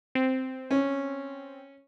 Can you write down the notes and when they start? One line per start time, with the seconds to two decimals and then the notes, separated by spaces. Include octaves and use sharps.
0.15 C4
0.71 C#4